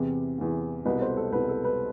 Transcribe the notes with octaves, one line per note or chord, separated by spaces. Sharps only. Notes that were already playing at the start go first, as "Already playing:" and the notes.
Already playing: E2 C3 E3
E2 C3 E3
C2 B2 B4 D#5
A4 C5
A4
C2 B2 B4
A4
B4